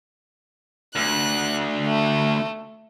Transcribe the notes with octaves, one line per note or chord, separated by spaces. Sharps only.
D2 F#6
A3